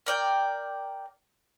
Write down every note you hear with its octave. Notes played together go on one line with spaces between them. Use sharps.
A#4 D5 G5